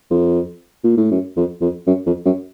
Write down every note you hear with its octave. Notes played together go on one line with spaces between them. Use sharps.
F2
A#2
A2
F#2
F2
F2
F#2
F2
F#2